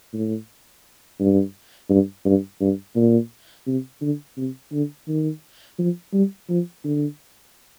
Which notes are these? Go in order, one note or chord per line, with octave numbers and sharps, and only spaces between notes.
A2
G2
G2
G2
G2
A#2
C3
D3
C3
D3
D#3
F3
G3
F3
D3